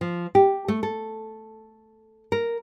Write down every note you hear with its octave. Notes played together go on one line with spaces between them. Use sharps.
F3
G4
A3
A4
A#4